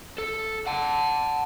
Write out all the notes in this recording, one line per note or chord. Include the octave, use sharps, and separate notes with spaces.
A4
F#5 A5